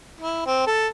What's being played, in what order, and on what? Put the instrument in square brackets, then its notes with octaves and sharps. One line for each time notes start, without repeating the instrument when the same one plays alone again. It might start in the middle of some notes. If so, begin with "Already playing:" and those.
[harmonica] E4
C4
A4